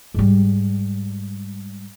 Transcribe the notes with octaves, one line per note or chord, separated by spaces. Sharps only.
G#2 G3